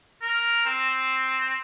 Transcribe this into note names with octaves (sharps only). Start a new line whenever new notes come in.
A#4
C4